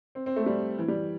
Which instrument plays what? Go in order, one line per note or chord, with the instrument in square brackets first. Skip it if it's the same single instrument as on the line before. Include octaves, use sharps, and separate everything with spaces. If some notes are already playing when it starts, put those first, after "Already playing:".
[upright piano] C4
C4
A3
G3
E3
G3